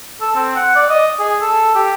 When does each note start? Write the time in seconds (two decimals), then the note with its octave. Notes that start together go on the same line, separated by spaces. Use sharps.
0.21 A4
0.36 C4
0.56 F#5
0.76 D5
0.90 D#5
1.19 G#4
1.42 A4
1.75 G4